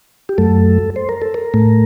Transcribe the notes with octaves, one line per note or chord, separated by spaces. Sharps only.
G4
F#2 F#3 A3 A4
C5
A#4
A4
A#4
A2 A3